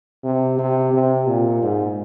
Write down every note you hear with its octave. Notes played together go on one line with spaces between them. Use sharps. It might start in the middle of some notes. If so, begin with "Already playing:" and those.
C3
C3
C3
A#2
G#2